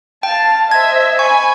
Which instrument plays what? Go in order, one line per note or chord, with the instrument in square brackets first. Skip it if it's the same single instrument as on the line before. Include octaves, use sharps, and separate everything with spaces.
[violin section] F5 A5 [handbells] G5
[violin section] C5 D#5 E5 [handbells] G#6
[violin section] G#5 B5 [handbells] C#6